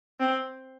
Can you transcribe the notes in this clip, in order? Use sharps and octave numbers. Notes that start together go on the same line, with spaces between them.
C4